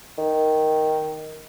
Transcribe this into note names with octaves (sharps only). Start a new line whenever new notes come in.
D#3